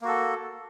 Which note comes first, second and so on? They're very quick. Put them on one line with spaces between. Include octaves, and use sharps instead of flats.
A#3 F#4 A4